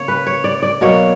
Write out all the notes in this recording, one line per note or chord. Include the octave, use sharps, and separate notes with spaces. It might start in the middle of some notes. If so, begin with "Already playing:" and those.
Already playing: C#3 A#3 C#5
B4
C#5
D5
D5
B2 F#3 A#3 C#5